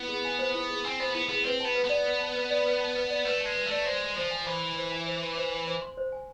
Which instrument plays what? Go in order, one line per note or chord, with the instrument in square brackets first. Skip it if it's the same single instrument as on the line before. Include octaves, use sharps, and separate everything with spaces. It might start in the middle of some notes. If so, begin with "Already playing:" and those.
Already playing: [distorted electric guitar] B3 [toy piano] E4
[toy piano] G#4
G#5
C5
E4
G#4
[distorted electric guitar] C4 [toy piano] G#5
[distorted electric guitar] B3 [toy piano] C5
[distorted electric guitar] B3 [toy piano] E4
[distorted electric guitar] B3 [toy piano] G#4
[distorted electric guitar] C4 [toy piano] B4
[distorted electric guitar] B3 [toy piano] A5
[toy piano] B4
[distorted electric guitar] B3
[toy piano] D5
B4
A5
B4
D5
B4
A5
B4
D5
[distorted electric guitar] A3 [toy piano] B4
[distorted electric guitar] G#3 [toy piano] A5
[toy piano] B4
[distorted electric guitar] A3
[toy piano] D5
[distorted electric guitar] G#3 [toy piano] C5
[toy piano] C6
[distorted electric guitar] F3 [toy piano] C5
[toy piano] G#5
[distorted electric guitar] E3 [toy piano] C5
[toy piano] C6
C5
G#5
C5
C6
C5
G#5
C5
C6
C5
G#5